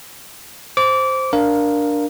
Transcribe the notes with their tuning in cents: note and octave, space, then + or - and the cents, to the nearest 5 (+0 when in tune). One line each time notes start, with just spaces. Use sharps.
C5 +0 D6 -25
D4 +0 A#4 +5 F5 +0